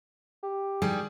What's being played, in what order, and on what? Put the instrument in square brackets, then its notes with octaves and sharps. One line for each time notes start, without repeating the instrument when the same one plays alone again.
[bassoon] G4
[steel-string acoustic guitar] D#3 G3 [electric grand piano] G#4